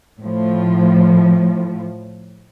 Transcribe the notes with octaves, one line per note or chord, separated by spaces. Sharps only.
A2 F3